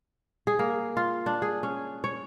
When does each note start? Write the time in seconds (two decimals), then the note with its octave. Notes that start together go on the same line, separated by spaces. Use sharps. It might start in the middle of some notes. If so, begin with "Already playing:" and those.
0.47 G#4
0.59 A#3
0.97 F4
1.26 D4
1.42 G#4
1.63 C#4
2.04 C#5